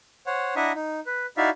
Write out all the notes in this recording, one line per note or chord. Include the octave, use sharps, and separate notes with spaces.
C5 C#5 F#5
D4 E4 D#5 E5 F#5 A#5
D#4
B4
D#4 E4 F#4 D5 E5 F5